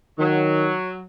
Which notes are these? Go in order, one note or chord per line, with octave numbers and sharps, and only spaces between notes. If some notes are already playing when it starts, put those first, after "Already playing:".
D#3 F#3